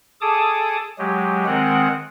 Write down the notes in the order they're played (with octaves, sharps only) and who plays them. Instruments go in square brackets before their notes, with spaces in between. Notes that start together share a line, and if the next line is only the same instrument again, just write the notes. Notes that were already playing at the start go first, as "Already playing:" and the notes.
[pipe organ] G#4 A4 A5 D6 D#6
F#3 G#3 G4
D#3 G#3 C4 A#4 F#5